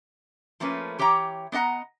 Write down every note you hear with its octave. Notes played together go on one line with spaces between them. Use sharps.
F3 A3 A#3 C#4 B4
E3 G4 C#5 G5 A#5
B3 D4 D#5 F#5 A#5